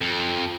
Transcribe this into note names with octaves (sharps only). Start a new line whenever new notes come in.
F2